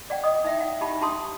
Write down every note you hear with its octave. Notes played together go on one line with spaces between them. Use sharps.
D5 F#5 G5
D#5 D#6
D#4 E5 G5
F#5
D#4 G4 A5 B5
D4 G4 A5 C6 D#6